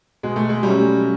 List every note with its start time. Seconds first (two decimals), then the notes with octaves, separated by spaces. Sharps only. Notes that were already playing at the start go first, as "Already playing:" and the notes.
0.23 B2 G#3
0.36 A3
0.49 G#3
0.63 F#3 G3 A3 C#4